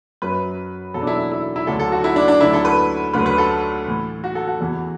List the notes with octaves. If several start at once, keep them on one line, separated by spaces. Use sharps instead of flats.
F#2 F#3 B4
E2 B2 F#3 A4
D4
E4
E4
E4
D2 D3 F#3 A4
A4
F#4
E4
D4
D4
D2 D3 F#3 E4
A4
B4
D2 D3 F#3 B4
B4
A4
A2 E3
F#4
A4
F#4
E2 E3